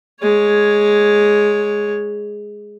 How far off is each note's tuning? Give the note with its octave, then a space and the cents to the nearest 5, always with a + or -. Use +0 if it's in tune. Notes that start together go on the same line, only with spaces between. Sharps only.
G#3 +0 C#5 +0